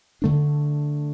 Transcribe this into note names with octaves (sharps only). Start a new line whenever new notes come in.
D3 A3 D4